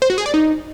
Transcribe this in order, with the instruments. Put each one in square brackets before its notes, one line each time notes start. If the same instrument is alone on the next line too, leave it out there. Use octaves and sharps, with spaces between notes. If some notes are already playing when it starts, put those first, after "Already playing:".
[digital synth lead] C5
F#4
G#4
D5
D#4